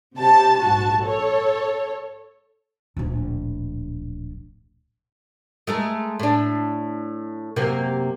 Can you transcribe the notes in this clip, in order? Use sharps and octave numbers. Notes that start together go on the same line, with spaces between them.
C3 G4 A5
A#1 G#2 F#4 A5
A4 C#5
D1 A#1
G#3 A3 A#4
A2 D4
F#2 C3 A#3